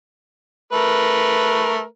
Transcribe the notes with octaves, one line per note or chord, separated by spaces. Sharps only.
A3 A#4 B4